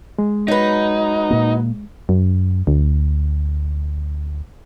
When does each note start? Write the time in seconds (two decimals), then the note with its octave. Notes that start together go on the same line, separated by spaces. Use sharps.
0.19 G#3
0.48 F#3 D#4 B4
1.30 A#2 A#3
2.09 F#2
2.67 D2